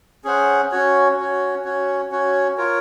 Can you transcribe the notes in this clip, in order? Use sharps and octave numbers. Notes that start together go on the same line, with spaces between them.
C#4 G#4 C5 F#5
C#4 F#4 C#5
C#4 F#4 C#5
C#4 F#4 C#5
C#4 F#4 C#5
F4 A#4 C#5